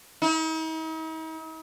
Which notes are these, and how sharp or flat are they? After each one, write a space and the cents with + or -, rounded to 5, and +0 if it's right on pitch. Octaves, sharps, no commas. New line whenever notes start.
D#4 +45